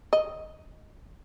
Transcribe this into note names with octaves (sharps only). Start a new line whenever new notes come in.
D#5